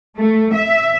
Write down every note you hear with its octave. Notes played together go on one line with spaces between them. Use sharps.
A3
E5